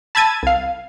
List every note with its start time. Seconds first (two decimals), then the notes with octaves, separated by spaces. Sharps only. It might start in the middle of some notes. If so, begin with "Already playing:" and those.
0.15 A5 B5 E6 G#6 A6 D#7
0.43 C2 F5